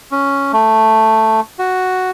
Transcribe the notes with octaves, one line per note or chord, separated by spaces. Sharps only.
C#4
A3
F#4